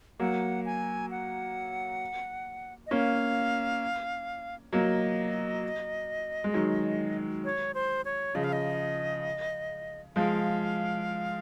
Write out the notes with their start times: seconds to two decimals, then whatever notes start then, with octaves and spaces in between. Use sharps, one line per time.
0.20 F#3 A#3 F#5
0.65 G#5
1.11 F#5
2.87 D#5
2.91 A#3 C#4 F5
4.73 F#3 A#3 D#5
6.44 G#3
6.54 D#3 F#3
7.45 C#5
7.74 C5
8.05 C#5
8.35 C#3 F3 D#5
8.44 F5
8.53 D#5
10.16 F3 G#3 F5